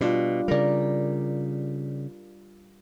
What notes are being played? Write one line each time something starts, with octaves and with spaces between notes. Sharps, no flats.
B2 G3 D4 F4
C#3 G3 A#4 D5